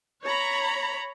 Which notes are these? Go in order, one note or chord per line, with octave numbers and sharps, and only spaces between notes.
C#5 A#5 B5